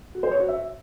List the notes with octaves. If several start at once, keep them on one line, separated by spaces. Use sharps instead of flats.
F#4
C5
C#5
F#4
E5